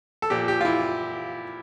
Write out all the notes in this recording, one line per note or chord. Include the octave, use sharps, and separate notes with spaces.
A4
A#2 F3 G4
G4
F4
E4